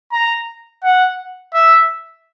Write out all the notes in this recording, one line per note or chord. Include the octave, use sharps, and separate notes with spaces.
A#5
F#5
E5